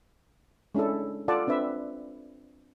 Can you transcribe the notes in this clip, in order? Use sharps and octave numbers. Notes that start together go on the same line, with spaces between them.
G#3 C#4 D4 E4 A4
F4 A4 D5 F#5 A5
C4 D4 B4 E5